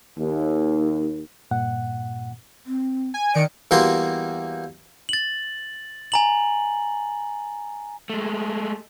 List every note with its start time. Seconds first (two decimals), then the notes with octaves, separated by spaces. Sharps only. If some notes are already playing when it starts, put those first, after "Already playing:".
0.18 D#2
1.51 G2 A#2 F#5
2.66 C4
3.14 G#5
3.35 D#3 D5 C#7 D7
3.71 E2 G3 A#3 F#4 C6
5.09 A6 F#7
6.12 G#5 A#5 F#7
8.10 G#3 A3